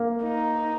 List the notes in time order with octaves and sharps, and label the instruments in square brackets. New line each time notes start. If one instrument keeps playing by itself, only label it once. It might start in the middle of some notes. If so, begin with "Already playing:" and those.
Already playing: [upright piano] A#3
[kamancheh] D#4